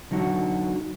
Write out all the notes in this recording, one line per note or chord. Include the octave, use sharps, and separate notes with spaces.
D3 F#3 D#4 F#4